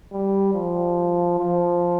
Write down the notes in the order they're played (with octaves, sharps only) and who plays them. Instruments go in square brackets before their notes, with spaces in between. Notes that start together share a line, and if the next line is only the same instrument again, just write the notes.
[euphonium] G3
F3
F3